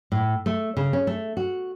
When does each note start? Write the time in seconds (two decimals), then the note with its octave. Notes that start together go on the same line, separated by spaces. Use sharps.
0.12 A2
0.46 A3
0.77 C#3
0.93 C#4
1.07 A3
1.37 F#4